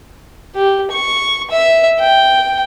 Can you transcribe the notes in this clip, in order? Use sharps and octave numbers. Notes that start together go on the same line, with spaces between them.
G4
C#6
E5
G5